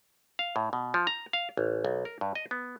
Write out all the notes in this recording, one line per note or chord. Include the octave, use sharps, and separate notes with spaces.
F5
A2
B2
F3
A#5
F5
A1
B1
A#4
G2
D#5
B3